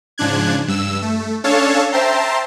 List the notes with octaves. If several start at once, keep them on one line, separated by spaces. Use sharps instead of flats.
G#2 C#3 F3 D4 F#6 G#6
G2 E6
A3
C#4 D4 A4 C#5 F5 A5
C5 E5 G5 A5 A#5 C6